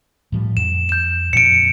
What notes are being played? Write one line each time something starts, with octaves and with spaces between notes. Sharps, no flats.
A2 F3 G3
F2 E7
G6 E7
F2 A#2 F3 C#7 D7